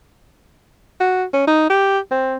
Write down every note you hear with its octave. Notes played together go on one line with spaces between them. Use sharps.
F#4
C#4
D#4
G4
C4